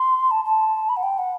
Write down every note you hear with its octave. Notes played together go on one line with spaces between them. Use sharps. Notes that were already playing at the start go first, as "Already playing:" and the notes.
Already playing: C6
A5
A5
B5
F#5
G5
F#5